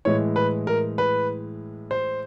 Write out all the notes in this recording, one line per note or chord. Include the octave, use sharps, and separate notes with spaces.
A2 E3 G#3 C#5
B4
A#4
B4
C5